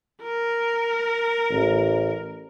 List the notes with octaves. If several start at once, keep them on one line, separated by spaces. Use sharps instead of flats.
A#4
A1